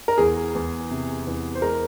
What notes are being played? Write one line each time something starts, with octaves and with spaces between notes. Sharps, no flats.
A#4
E2 G#4
E2
C3
E2
C5
G#3 A#4